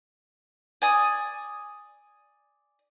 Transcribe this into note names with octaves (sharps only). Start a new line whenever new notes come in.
D5 G#5 D#6